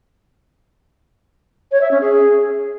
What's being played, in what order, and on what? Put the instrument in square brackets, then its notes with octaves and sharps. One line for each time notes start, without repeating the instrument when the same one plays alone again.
[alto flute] C#5
E5
C#4
G#4